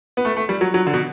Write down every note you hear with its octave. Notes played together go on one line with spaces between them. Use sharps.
B3
A3
A3
G3
F#3
F#3
D3
B2